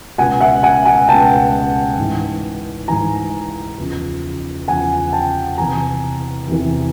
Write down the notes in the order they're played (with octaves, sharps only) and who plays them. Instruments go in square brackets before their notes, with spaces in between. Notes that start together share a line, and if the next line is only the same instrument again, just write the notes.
[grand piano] C#2 B2 F#5 G#5
E5 F#5
F#5 G#5
F#5 G#5
C#2 B2 G5 A5
G#2 E3
G#2 E3 G#5 A#5
E2 C#3 F3
E2 C#3 F3 F#5 G#5
G5 A5
E2 C3 E3 G#5 A#5
E2 C3 E3